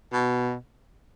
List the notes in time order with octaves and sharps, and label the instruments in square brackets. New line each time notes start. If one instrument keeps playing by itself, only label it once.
[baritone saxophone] B2